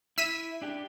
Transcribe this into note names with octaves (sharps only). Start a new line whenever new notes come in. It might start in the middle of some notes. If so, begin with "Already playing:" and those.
E4 E6 B6 D#7
D4 G4